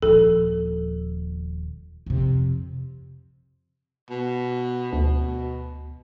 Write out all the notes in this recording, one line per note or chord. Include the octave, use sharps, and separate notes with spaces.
D#1 F3 A4
F2 C3
B2
D2 B2